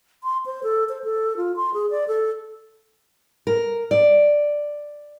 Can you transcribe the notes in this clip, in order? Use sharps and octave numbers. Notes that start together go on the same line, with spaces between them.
C6
C5
A4
C5
A4
F4
C6
G#4
D5
A4
A#4
D5